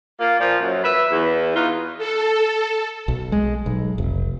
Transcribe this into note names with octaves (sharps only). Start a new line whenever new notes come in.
A#3 F4
A#2 F3
F#2
B4 E5
E2
D#4 F4 F#4 B4
A4
B1
G#3
B1
F1